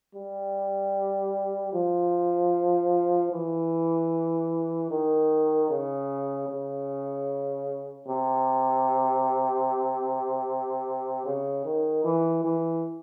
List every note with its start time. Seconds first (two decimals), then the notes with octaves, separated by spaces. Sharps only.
0.15 G3
1.73 F3
3.32 E3
4.90 D#3
5.70 C#3
6.49 C#3
8.08 C3
11.25 C#3
11.65 D#3
12.04 E3
12.44 E3